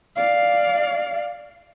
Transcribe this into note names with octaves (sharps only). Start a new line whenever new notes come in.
D5 F5